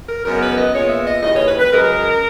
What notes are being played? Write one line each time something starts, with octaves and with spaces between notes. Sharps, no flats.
A#4
F#2 C#3 G#3 B3 A#4
B4
D#5
A#2 G#3 B3 C#5
E5
D#5
D#2 C#3 E3 D#5
C#5
B4
B4
F#2 C#3 G#3 A#4